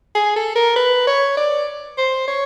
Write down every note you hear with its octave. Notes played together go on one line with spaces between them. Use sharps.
G#4
A4
A#4
B4
C#5
D5
C5
C#5